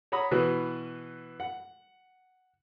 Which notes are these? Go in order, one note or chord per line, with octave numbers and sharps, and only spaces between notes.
C#5 F#5 A#5 B5 D#6
B2 E3 B3 B4
F#5